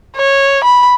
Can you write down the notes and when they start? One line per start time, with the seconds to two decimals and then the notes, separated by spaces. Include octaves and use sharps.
0.16 C#5
0.64 B5